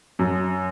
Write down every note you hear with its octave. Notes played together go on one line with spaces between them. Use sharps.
F#2